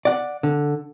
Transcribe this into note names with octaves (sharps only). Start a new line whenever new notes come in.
D5 F#5
D3